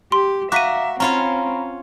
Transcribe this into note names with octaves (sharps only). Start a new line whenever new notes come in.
G4 C6
F#4 E5 F5 A#5 D6 F#6 B6 D#7
C4 C#4 F4 C#5 A#5 B5